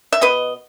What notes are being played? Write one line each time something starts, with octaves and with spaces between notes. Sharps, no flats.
E5
B2 B4 D#5